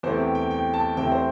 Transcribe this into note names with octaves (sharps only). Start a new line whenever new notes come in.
E2 C3 E3 A3 C4 C5
G4
G5
G5
A5
E2 C3 E3 A3 C4 G5
C5